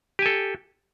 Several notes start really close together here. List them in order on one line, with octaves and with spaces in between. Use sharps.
G4 G#5 A4